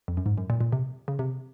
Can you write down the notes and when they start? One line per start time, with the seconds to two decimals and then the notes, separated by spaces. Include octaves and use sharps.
0.08 F2
0.17 F#2
0.26 G#2
0.38 F#2
0.50 A#2
0.61 A#2
0.72 C3
1.08 C#3
1.19 C3